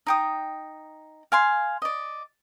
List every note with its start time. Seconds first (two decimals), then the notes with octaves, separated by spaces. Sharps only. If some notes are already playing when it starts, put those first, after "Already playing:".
0.07 D#4 G5 D#6
1.32 F5 G#5 C6
1.82 D5 D#5